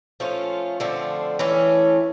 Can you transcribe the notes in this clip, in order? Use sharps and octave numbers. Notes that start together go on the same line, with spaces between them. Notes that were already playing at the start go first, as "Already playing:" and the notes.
F3 A3 C#4 F4
D3 F3 A3 C4
E3 A3 C#4